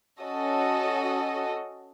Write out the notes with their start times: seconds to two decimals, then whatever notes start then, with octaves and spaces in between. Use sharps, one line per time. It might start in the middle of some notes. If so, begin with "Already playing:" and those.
0.21 C#4 F#4 A4 D#5